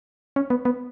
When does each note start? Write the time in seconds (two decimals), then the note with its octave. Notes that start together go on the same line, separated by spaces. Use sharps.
0.36 C#4
0.50 B3
0.65 B3